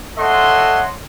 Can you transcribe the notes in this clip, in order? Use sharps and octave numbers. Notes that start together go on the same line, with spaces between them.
A4 C#5 D#5 E5 F#5 C6